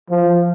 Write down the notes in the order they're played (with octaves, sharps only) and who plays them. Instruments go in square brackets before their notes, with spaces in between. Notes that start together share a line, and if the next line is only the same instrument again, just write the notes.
[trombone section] F3